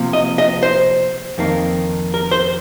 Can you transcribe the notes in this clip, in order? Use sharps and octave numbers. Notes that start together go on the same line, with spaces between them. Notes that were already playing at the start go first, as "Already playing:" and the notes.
Already playing: C3 F3 A#3
D#5
D#5
C5
F2 D#3 A#3
A#4
C5